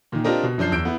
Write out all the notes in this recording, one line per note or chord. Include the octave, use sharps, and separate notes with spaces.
A#2 D#3
C4 D4 F4 G4 A#4 D#5
B2
F#2 F3 D4 G6 C7
E2 E6 G6 D7
B3 E4